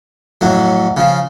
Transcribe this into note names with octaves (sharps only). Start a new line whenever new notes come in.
F2 A2 F#3
C#3 F3